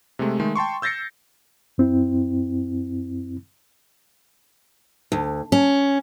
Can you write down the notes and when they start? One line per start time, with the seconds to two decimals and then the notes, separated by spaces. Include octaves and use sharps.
0.19 C3 G#3 A3
0.40 D#3 G#3 A3
0.56 G5 A5 C6 C#6
0.82 E6 G6 A6 A#6 C7 C#7
1.78 F#2 C4 E4
5.12 D2
5.52 C#4